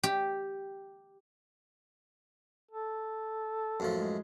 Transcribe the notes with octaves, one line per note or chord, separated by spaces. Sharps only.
G4
A4
F#2 A2 F3
G#3